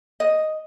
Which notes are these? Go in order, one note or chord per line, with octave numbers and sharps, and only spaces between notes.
D#5